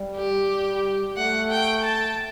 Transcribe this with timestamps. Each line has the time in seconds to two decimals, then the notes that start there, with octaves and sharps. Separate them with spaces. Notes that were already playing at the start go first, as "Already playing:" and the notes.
Already playing: G3
0.17 G4
0.50 G3
1.17 A3 F#5
1.51 G5
1.84 A5